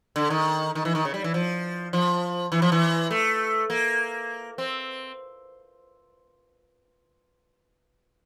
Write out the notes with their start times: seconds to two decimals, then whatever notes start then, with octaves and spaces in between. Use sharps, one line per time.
0.16 D3
0.30 D#3
0.75 D#3
0.85 E3
0.95 D#3
1.05 C#3
1.14 G3
1.24 E3
1.34 F3
1.93 F3
2.52 E3
2.62 F3
2.72 E3
3.11 A3
3.70 A#3
4.58 C4